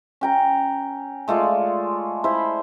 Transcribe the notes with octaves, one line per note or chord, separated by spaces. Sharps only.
C#4 G5 A#5
G#3 A3 F4 D5
E4 C5 B5